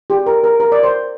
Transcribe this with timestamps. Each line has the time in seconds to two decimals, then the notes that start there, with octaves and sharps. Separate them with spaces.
0.10 G4
0.26 A#4
0.44 A#4
0.60 A#4
0.72 D5
0.83 C5